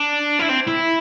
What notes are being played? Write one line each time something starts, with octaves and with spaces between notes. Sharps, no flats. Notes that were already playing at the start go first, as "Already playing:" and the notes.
Already playing: D4
E4
C4
E4